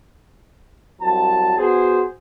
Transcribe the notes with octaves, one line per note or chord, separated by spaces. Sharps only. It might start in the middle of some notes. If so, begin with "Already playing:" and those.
C2 F#3 A5
B3 F#4 G#4 C5